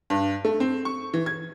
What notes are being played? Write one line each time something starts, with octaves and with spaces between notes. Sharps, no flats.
G2
A3
C4
C#6
E3
G#6